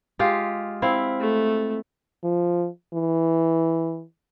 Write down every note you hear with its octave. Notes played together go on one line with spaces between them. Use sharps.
G#3 F4 G4
C4 E4 F5
A3
F3
E3